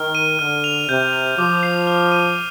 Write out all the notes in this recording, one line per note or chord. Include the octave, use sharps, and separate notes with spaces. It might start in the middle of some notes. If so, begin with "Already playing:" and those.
Already playing: D#3 F6
D#7
D3 F6
F7
C3 G6
F7
F3 D6
C7
F6
D#7